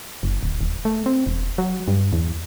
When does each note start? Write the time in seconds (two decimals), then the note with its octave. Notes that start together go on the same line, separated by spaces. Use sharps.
0.23 F#1
0.43 D1
0.61 D#1
0.85 A3
1.06 C4
1.26 E1
1.58 F#3
1.88 G2
2.13 E2